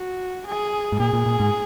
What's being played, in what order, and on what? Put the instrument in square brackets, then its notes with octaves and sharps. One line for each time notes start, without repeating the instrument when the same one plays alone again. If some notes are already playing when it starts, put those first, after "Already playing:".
Already playing: [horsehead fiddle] F#4
G#4
[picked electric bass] G#2
[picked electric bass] A#2 [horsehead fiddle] G#4
[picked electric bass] A#2
A#2
G#2